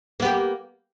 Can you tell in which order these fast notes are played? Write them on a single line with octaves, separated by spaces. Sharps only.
A#3 B3 G4